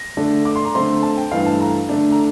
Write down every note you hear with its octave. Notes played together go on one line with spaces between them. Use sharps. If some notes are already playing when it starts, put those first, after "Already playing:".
Already playing: A#6
D3 A3 D4
D6
C6
A#5
D3 A3 C4 C6
A5
G5
G2 E3 A3 F5
A5
A#5
D3 A3 D4
A#5